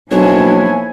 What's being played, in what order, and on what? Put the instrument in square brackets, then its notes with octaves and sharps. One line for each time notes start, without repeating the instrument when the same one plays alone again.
[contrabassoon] B1 [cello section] F3 A#3 E4 [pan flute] D4 [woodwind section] C#5 G#5